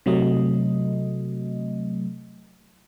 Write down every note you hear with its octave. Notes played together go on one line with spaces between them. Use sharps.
C3 F#3 A3 D#5